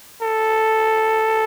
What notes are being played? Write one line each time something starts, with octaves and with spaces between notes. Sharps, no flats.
A4